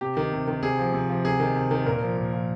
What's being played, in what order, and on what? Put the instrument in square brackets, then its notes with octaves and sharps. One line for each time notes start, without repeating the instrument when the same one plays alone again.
[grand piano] C3 G4
D#3
C3
D#3
C3 G#4
F3
C3
F3
C3 G#4
D#3
C3
D#3
A#2 A#4
F3
A#2
F3